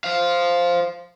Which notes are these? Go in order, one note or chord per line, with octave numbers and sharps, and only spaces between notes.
C5 F5